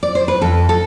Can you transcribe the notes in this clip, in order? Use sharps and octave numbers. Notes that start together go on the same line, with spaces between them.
D5
C5
B4
F2 A4
A4